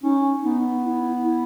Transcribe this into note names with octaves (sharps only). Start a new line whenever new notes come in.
C#4 D#4
B3 D#4
E4
E4